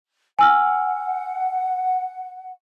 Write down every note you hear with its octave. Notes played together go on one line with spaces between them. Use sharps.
F#5 G#5 E6 F6